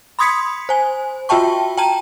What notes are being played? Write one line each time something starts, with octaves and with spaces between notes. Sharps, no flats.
B5 C6 D#6 G#6 B6 C#7
C5 G#5
F4 F#4 E5 G5 A5 C#6
G5 A5 A#5 D#7